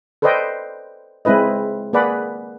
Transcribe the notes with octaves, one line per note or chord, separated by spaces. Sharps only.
A4 B4 C5 D5 D#5 G5
G#3 C4 E4 B4 D#5
A#3 G#4 B4 D5 F#5 B5